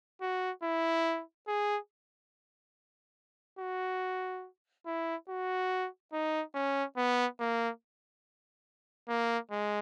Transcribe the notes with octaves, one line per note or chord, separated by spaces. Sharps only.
F#4
E4
G#4
F#4
E4
F#4
D#4
C#4
B3
A#3
A#3
G#3